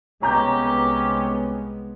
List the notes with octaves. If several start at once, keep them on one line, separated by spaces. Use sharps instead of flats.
C2 G#3 B3 C#4 G4 A#5 G6